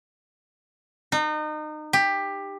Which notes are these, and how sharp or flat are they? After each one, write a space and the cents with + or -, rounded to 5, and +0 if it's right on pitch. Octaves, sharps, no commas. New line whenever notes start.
D#4 -30
G4 +15